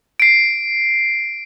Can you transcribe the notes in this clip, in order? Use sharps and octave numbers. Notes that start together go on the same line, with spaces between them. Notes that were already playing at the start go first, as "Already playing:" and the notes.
C7 D7